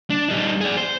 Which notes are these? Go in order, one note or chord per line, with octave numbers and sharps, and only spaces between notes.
D4
G3 D#4
G#4 D5
C5